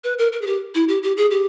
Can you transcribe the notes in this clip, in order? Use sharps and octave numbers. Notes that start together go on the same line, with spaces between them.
B4
A#4
A#4
G#4
G4
E4
G4
G4
G#4
G4